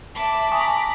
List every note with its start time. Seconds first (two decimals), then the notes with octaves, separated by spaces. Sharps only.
0.15 E5 A5 B5 D6
0.52 G#5 A#5 B5 C#6 D#6